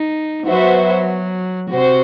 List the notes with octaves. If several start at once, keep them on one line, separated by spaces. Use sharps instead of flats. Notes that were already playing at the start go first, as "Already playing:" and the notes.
Already playing: D#4
F#3 B3 F#4 C5 E5
C3 F#4 C5